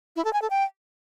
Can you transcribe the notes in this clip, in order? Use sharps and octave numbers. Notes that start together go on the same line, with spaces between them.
E4
A4
G#5
A4
G5